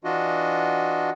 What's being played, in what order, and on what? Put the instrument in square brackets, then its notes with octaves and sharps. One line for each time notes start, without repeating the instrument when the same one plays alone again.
[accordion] E3 D4 F4 F#4 D#5